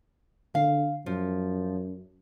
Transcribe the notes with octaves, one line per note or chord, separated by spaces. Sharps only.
D3 F5
F#2 F3